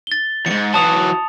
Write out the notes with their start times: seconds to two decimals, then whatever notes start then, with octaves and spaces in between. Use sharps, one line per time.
0.07 A6 G7
0.46 E2 G#2 C#7
0.74 E3 F#3 A5 D#6 F7